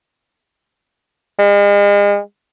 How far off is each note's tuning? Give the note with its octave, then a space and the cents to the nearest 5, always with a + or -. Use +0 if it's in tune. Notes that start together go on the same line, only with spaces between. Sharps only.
G#3 -40